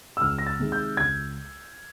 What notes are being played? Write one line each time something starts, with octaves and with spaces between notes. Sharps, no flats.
E6
C#2 F6
A#6
A6
C3 D#3 G#3
G6
C#2 G#6